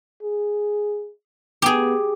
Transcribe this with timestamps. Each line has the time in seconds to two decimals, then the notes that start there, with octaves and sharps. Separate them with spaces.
0.22 G#4
1.62 B3 G4 G#4